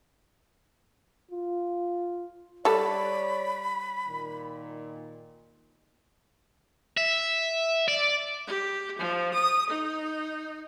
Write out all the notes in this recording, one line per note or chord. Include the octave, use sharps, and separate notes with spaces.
F4
G3 A4 C#5 D5 B5
A#2 D#3
E5
D5
G4
F3
D#6
D#4